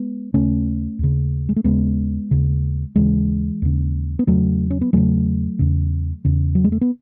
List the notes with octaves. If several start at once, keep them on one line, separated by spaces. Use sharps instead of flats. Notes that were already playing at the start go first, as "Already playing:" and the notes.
Already playing: G#3 B3
D#2 C#3 A3 C#4
D#2 C#3
G#3
A3
D#2 C#3 G#3 B3
D#2 C#3
D#2 C#3 E3 G#3
D#2 C#3
B3
E2 C#3 F#3 A3
C#4
B3
E2 C#3 F#3 A3
E2 C#3
E2 C#3
F#3
G#3
A3
B3